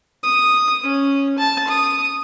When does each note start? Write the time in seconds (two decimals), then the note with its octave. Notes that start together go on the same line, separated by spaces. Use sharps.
0.23 D#6
0.83 C#4
1.38 A5
1.67 D#6